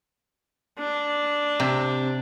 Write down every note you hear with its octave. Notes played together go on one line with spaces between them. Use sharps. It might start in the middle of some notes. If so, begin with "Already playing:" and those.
D4
C3